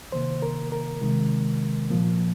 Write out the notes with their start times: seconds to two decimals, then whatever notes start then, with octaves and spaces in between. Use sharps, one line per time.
0.12 C3 D#3 A#3 C5
0.42 A#4
0.72 A#4
1.01 C3 D#3 G#3
1.90 A#2 F3 A#3